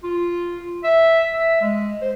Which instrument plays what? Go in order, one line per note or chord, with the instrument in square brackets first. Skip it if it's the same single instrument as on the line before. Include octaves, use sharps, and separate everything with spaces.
[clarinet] F4
E5
E5
G#3
C5